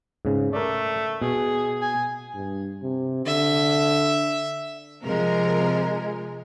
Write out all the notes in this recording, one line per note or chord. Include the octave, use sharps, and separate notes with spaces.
G#2 C#3
A3 A#4 D5
B2 G#4
G#5
G2
C3
D3 E5
C3 F3 G#3 A#4